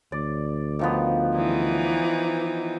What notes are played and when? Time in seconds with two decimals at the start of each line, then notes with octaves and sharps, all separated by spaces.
0.12 D2 D5
0.79 D#3 F3 B3
1.35 E3 D#4